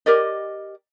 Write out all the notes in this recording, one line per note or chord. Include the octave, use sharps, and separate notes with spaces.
G4 A#4 D5 D#5